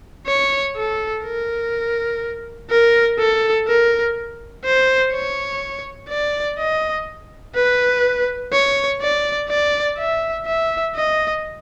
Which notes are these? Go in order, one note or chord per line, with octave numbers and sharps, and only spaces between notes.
C#5
A4
A#4
A#4
A4
A#4
C5
C#5
D5
D#5
B4
C#5
D5
D5
E5
E5
D#5